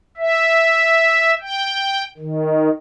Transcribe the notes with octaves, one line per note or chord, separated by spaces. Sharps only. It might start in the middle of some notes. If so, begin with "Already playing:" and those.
E5
G5
D#3